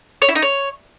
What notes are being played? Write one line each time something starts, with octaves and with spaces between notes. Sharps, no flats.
C#5
E4
D#4
C#5